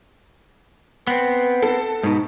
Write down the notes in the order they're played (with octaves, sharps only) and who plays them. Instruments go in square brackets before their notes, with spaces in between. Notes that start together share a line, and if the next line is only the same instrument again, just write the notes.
[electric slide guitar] B3 C4 [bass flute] B4
[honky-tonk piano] A4
[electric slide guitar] G#2 B2 [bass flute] D#4